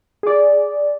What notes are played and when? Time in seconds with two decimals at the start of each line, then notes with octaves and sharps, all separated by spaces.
0.23 G#4 D5